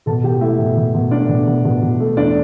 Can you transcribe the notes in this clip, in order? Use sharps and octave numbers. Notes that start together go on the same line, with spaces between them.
B2 A4 A5
B2 G4 G5
A3 E4 E5
B2
B2
B2
A3 D4 D5
B2
B2
B2
B2
A3
E2 D4 D5